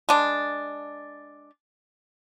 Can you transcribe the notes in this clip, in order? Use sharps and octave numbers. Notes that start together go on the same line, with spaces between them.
G#3 D4